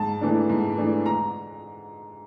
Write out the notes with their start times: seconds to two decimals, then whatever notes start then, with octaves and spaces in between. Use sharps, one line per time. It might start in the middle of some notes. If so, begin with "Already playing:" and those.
Already playing: G#2 A5
0.21 E3 A3 D4
0.49 G#2
0.77 E3 A3 D4
1.06 A#5